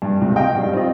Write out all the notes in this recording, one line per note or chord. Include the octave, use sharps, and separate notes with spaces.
G2
C#2 C3
D#5 F5 G5
G2 G3
C4 F4 D#5